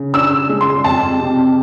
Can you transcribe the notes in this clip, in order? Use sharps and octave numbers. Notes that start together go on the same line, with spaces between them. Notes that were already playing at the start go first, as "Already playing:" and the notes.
Already playing: C#3
D4 E6
G#3
C6
F2 A5
C3